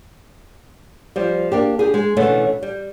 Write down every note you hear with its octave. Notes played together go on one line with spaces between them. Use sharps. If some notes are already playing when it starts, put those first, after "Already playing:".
F3 G3
A#3 D4 G4
G4 G#4
G#3
B2 D3 E3 A3 C#4
G3